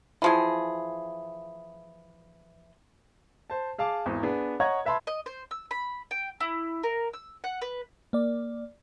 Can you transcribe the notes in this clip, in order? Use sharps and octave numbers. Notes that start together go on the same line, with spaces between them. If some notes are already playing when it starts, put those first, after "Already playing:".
E3 F3 G#4
C5 A5
G#4 F5 A5 D6
G#1 E2
B3 D4 G#4
C#5 D#5 F#5 A#5 C#6 G#6
B4 E5 A5 B5 C6
D#5
C5
E6
B5
G5
E4
A#4
E6
F#5
B4
A#3 D5